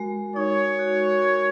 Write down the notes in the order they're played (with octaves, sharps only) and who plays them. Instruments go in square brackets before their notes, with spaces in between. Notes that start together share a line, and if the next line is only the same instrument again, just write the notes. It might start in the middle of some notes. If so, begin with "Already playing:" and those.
Already playing: [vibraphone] G#3 F#4 A#4
[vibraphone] D#4 [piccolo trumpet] C#5
[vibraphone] F#4
A#4